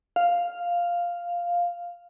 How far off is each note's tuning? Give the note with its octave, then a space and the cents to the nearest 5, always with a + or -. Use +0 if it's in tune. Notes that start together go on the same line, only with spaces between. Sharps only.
F5 +0